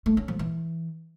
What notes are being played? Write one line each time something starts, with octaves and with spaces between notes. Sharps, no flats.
A3
C#4
F3
E3